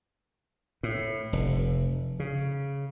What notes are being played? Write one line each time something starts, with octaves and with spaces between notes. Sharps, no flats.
A2
F1
C#3